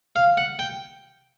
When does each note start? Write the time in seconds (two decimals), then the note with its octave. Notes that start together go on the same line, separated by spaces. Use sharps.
0.16 F5
0.37 F#5
0.59 G5